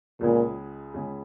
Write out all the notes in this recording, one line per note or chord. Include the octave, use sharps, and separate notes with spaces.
C#2 A#2 C#3 G#3
C#2 C#3 G#3